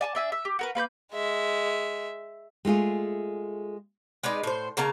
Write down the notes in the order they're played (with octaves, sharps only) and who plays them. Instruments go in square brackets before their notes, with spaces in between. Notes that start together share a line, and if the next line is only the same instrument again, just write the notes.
[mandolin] D5 G#5 A5
D4 E5 G#5
E5
G4
F#4 A#4 B4
A#3 B4 B5 G6
[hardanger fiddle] G#3 E5
[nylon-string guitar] G#3 A3 F4 G#4
[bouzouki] G#3 D#4 B4 D5
A2 C5
C#3 A#3 A5 A#5